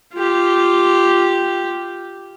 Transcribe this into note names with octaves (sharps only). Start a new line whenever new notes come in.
F4 G4